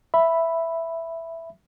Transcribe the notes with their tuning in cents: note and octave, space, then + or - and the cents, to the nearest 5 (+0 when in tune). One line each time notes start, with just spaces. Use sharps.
E5 +5 B5 +0